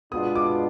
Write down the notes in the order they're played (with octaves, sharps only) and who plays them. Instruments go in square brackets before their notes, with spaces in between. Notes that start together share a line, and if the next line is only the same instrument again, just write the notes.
[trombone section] B2 G#3 B3 D4 F4 [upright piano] D#6
[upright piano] D6